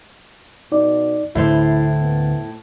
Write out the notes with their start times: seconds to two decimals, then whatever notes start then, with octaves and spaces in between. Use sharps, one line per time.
0.72 B2 D#4 D5
1.35 D2 A2 D3 A3 E4 C5 E5
2.01 B3